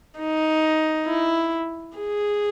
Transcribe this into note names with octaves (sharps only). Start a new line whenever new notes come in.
D#4
E4
G#4